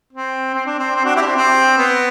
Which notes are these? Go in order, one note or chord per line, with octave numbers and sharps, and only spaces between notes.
C4
C4
D4
C4
C4
D4 F#4
E4 G4
D4
C4
C4
B3